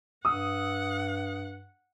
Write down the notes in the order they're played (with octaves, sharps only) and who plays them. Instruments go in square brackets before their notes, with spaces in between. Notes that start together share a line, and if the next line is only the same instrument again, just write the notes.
[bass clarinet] G2 [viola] F#5 [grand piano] D#6 E6